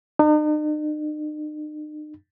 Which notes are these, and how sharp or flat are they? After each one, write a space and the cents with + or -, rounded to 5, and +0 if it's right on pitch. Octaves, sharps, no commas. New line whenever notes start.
D#4 -45